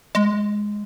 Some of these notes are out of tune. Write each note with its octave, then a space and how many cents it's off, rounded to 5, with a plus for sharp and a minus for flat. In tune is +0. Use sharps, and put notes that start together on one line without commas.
G#3 +0